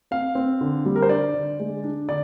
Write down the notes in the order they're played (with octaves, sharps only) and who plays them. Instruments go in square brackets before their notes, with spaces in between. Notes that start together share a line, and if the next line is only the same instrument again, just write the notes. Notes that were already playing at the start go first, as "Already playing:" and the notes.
[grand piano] C4 F5
C4
D3
G3
A#4
C5
D4 D5
D3
G#3
D4
D3 D5